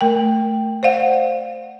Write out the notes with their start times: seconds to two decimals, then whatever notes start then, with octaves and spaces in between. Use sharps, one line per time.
0.01 A3 A#4 G5
0.83 C5 D5 F5 F#5